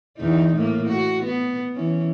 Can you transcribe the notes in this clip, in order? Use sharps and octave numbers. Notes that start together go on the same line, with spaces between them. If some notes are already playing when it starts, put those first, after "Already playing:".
E2 D#4
A2 A#3
F#4
B3
E3 C#4